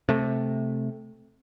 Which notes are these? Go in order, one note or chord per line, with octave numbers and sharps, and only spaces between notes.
C3 A3